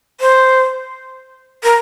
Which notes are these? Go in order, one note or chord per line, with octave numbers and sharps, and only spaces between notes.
C5
A#4